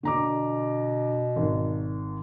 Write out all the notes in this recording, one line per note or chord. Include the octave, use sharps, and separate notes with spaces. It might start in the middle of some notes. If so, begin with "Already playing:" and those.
B2 D3 A#5 D6
G#1